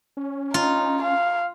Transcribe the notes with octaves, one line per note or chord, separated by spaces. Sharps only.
C#4
D#4 F4
F5